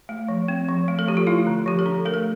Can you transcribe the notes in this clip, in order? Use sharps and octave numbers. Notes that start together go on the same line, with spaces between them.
A3
F3
C4
F3
A3
A4
F3 G4
F4
A3 E4
D3
F3 G4
A4
D4
A3 A#4
A4